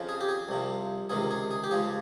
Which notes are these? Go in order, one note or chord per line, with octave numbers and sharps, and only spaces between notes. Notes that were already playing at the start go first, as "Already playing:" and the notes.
Already playing: F2 C#3 F3
G#4
G4
G#4
C2 C3 F3
C#2 C3 D#3 G#4
G#4
G#4
G4
C#2 C#3 F3 G#4